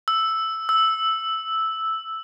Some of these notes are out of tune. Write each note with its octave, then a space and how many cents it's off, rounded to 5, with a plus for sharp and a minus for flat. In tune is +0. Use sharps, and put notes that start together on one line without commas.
E6 +0
E6 -5